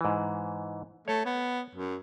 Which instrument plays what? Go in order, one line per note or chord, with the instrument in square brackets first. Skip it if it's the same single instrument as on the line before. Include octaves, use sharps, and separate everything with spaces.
[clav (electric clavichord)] G#2 E3
[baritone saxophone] A3 [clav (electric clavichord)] C#5
[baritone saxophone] B3
F#2